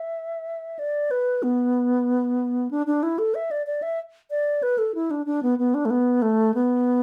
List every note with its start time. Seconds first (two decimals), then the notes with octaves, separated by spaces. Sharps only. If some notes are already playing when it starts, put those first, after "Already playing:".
Already playing: E5
0.79 D5
1.11 B4
1.43 B3
2.71 D4
2.87 D4
3.03 E4
3.19 A4
3.35 E5
3.51 D5
3.67 D5
3.82 E5
4.31 D5
4.63 B4
4.78 A4
4.95 E4
5.11 D4
5.26 D4
5.43 B3
5.59 B3
5.74 D4
5.85 A3
5.90 B3
6.22 A3
6.54 B3